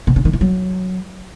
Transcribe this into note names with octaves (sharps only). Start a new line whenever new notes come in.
B2
C#3
D#3
E3
F#3